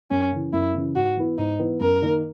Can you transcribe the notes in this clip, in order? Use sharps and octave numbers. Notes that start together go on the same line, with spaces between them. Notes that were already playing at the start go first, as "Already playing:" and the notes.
F#2 C#4
C#3 E3
F#2 E4
C#3 E3
G#2 F#4
E3 B3 E4 B4
G#2 D#4
E3 B3 E4 B4
F#2 A#4
D#3 A#3 D#4